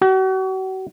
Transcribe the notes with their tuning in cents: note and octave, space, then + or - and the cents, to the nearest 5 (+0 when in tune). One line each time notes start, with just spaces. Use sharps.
F#4 +40